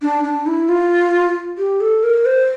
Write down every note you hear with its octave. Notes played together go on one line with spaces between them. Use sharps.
D4
D4
E4
F4
G4
A4
A#4
C5